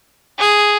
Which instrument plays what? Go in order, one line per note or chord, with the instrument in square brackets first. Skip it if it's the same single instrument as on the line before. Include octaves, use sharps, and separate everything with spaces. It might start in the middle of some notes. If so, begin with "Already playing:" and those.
[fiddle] G#4